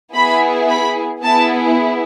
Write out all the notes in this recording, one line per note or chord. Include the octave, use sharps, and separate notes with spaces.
B3 E4 G#4 B5
B5
B3 E4 G#4 A5